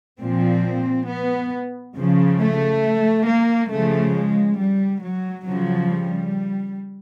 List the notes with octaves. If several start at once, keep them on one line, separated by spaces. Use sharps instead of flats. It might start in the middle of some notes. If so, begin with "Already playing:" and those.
A#2 F3 C4
B3
C#3 F3
A3
A#3
C#3 F3 A3
G#3
G3
F#3
C#3 F3 F#3
G3